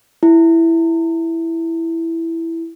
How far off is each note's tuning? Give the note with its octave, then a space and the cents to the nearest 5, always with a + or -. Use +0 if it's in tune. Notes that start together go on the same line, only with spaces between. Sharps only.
E4 +5